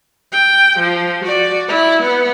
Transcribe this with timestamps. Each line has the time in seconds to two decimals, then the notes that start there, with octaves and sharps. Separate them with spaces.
0.32 G5
0.78 F3
1.24 F#4 D5
1.68 E4
2.02 B3